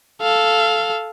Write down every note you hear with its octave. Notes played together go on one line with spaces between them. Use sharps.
A4 F5